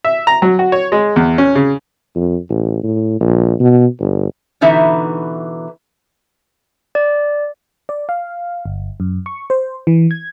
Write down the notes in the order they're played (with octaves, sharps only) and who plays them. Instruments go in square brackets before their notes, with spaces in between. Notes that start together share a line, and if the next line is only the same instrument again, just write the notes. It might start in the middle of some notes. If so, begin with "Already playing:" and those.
[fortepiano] E5
A#5
F#3
F#4
C#5
G#3
E2
C#4
C#3
[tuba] F2
A1
A2
A#1
B2
G1
[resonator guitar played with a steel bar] B2 D3 E3 D#4 E5
[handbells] D5
[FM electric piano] D5
F5
G1
F#2
C#6
C5
E3
G#6